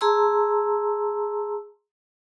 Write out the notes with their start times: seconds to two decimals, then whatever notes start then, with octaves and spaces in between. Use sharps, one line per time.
0.01 G#4 A5 A#5 C6 E6